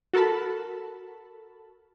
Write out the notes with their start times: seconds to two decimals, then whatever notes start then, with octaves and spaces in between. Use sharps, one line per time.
0.13 F#4 A4 A#4 A5 B5